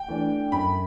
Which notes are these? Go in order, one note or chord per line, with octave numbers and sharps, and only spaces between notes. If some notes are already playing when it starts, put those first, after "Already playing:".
Already playing: G5
E3 A3 D4
F#2 B5